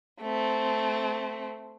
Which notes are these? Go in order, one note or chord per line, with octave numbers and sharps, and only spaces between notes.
A3 C4